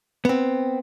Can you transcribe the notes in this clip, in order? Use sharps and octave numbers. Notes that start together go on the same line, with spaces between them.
B3 C4